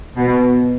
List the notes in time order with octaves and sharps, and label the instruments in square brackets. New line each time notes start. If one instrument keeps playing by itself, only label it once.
[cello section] B2